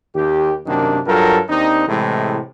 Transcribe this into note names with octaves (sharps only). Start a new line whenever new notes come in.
D#2 D#3 G4
F#2 C3 D#3 A#3 D4
G2 F#3 F4 A4 A#4
D#2 C4 D4 D#4
A2 C3 E3 G#3